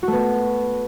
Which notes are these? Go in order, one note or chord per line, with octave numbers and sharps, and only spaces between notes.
A3 B3 F#4